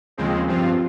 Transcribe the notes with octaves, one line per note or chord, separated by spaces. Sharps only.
D#2 C#3 F3 G#3 C4
G2 F3 C4 F4